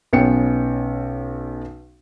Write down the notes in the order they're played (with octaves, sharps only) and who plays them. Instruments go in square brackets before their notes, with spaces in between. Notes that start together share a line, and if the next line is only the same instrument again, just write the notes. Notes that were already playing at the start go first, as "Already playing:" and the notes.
[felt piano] B1 B3 C#4 G5 C#7